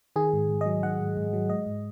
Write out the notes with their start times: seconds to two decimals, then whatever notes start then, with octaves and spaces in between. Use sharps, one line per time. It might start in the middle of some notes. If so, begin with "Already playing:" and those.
0.16 D#3 G#4
0.33 G#2
0.49 G#2
0.61 F#3 D#5
0.83 D#3 F#5
1.00 G#2
1.17 G#2
1.33 F#3
1.50 G#3 D#5
1.66 G#2